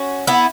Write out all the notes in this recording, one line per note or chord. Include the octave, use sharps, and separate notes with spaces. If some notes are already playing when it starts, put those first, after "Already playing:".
Already playing: C#4 F#4
B3 E4